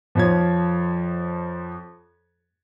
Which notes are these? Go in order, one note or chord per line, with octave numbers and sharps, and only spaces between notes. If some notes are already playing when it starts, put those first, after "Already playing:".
F2 F3 C#5 G#6